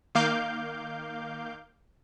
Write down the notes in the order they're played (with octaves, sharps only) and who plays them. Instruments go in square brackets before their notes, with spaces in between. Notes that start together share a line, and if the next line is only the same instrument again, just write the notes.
[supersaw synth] D#3 A#3 F5 D6 G6